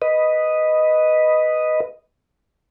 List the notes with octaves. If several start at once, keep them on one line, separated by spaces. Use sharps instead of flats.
B4 D#5